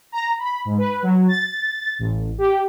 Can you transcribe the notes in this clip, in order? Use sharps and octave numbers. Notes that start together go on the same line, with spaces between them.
A#5
B5
G#2
B4
F#3
A6
A1
G4